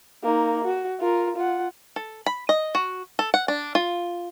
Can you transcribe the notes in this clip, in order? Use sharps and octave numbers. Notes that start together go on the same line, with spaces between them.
A#3 D#4
F#4
F4 A#4
F4 F#5
A4
B5
D#5
F#4
A4
F#5
D4
F4